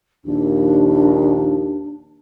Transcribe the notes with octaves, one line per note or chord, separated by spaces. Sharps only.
A#1 D#2 D4